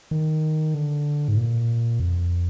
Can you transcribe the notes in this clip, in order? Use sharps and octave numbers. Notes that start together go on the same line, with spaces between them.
D#3
D3
G#2
A#2
F2